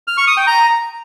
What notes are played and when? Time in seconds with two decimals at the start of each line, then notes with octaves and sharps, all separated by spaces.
0.08 F6
0.17 C#6
0.27 D#6
0.37 G5
0.47 A#5